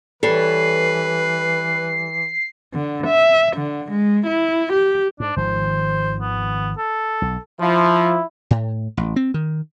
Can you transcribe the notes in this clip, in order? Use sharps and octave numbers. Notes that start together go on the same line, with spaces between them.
E3 G3 A4 B4 C#5 C7
D3
E5
D3
G#3
E4
G4
G#2 D4
G#1 D#3 F3 C5
B3
A4
B1
F3 E4
A2
A1
C4
D#3